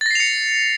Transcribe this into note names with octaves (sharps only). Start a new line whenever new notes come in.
A6 A#6 C7 C#7 F7